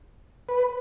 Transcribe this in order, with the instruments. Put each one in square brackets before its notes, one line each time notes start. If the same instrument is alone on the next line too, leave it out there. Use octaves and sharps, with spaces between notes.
[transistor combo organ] B4